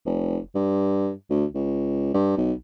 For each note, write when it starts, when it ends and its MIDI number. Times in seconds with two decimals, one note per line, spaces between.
0.05 0.39 29
0.55 1.11 43
1.30 1.45 38
1.54 2.11 37
2.14 2.33 43
2.37 2.52 35